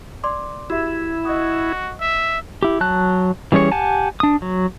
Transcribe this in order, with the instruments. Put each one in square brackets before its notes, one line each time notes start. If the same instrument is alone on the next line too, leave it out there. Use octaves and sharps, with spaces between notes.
[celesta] D5 C6 D6
[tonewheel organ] E4 [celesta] F#4 G4 E5
[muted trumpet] F#4 [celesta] D#5 D#6
[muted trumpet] E5
[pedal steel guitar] E4 G4
F#3 A5 F#6
E3 G3 C#4 G#4 C#5
G4 F#5 G#5 A5
D4 D#6
F#3